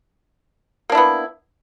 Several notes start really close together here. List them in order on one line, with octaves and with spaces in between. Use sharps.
A#3 D4 E4 B3